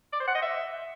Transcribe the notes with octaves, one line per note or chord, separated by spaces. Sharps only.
D5
C5
F#5
D#5
E5